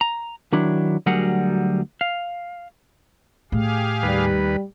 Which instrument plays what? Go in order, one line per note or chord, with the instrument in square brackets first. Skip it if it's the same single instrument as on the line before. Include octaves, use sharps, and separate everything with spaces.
[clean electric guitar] A#5
D#3 F#3 D4 E4
D2 F#3 G3 G#4 A#4 F#5
F5
[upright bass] A2 [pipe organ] G4 G#4 F5
[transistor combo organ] D#2 B4 [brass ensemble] G3